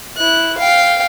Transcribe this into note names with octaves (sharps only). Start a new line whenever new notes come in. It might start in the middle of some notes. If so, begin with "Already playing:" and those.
E4 F#6
F5 G5